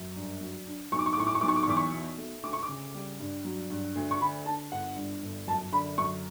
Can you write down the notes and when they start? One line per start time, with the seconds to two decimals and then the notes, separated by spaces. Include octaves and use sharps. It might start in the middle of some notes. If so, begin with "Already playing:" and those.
Already playing: F#2
0.16 G2
0.41 F#3
0.67 D4
0.92 B1 C#6
0.99 D6
1.06 C#6
1.13 D6
1.17 A2 C#6
1.27 D6
1.35 C#6
1.41 B1 D6
1.48 C#6
1.56 D6
1.63 C#6
1.68 E2 D6
1.77 C#6
1.93 B2
2.18 A3
2.43 D2 D6
2.53 C#6
2.63 D6
2.69 C#3
2.95 G3
3.20 G2
3.45 F#3
3.70 G2
3.95 D2
4.11 C#6
4.21 D3 B5
4.46 D4 A5
4.72 G1 F#5
4.96 G2
5.22 G1
5.47 F#2 A5
5.73 D3 B5
5.98 F#2 C#6